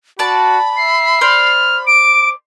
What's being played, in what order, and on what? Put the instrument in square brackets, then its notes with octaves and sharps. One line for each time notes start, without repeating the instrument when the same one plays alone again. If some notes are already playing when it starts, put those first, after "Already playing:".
[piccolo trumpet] F#4 [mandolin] D5 A5 [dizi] B5
[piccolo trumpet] E5 [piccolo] C7
[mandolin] C5 D5 [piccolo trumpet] F6
[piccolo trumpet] D6 [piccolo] D7